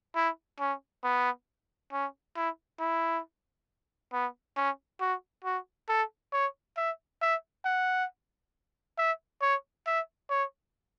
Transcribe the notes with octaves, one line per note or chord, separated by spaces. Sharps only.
E4
C#4
B3
C#4
E4
E4
B3
C#4
F#4
F#4
A4
C#5
E5
E5
F#5
E5
C#5
E5
C#5